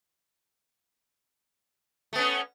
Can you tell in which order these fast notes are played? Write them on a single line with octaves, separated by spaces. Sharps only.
A3 B3 C#4